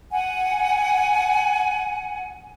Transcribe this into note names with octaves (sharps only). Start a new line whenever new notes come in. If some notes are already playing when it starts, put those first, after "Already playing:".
F#5 G#5